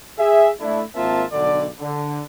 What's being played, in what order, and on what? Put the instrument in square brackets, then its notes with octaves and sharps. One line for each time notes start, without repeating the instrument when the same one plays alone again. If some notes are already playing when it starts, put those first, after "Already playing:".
[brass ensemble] G#4 E5
A3 D4 E4
G#1 A#3 C4 F4 E5 A5
B1 D3 D5
D3